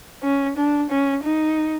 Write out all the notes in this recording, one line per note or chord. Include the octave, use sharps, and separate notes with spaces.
C#4
D4
C#4
D#4